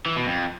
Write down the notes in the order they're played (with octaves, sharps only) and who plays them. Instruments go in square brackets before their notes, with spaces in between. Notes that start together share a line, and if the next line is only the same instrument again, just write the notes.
[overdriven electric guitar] E3
B2
F2